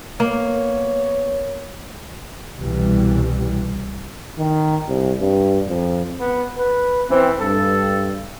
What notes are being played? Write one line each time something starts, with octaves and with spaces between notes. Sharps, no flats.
A#3 B3 A#4 C#5
C2 B2 E3 G3
D#3
C2
G2
F2
B3
B4
E3 C4
G2 A4